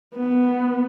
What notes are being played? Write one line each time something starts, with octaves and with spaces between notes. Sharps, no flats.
B3